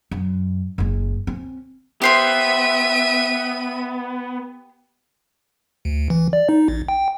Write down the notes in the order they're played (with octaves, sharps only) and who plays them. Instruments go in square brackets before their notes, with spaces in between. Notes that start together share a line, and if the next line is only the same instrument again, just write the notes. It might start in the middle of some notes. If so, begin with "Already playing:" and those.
[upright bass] F#2
F#1 G#3
C4 C#4
[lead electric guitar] B3 [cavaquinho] G4 C5 C6 [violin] E5 D#7
[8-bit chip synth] D2
E3
D5
D#4
A1
G5